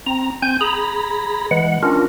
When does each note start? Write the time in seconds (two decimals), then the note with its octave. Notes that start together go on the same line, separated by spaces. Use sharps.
0.06 C4 A#5
0.42 C4 G#5 G6
0.61 G#4 A#5 B5
1.51 E3 G#3 F#5
1.83 C#4 D4 F4 A#4